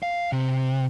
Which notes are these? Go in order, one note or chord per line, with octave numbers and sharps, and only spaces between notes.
F5
C3